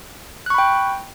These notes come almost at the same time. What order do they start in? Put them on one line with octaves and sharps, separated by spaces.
F#6 C#6 B5 G5